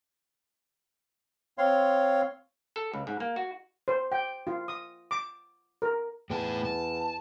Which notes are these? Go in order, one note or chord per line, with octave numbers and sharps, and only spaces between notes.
C4 C#5 F5 C6
A4
C#2
G#2
A#3
F#4
C5
G5
F4
D#6
D6
A#4
E2 A2 G5 A5
A5